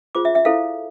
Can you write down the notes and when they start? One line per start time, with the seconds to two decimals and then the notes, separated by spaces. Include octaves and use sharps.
0.15 F4 G#4 C5 D6
0.25 E5
0.35 E5
0.45 E4 A4 C5 F5